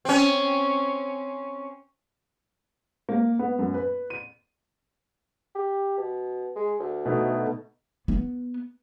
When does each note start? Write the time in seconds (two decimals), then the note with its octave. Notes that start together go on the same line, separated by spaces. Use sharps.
0.05 C4 C#4
3.09 A#3
3.39 B3
3.59 F#2
3.74 B4
4.10 D#7
5.55 G4
5.98 B2
6.56 G#3
6.80 D2
7.06 B2 A3 D#4
8.08 B3